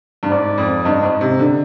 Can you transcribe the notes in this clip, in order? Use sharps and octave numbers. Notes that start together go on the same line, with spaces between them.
G2
G#2 D5
F2
G2 D#5
G#2
C3
D3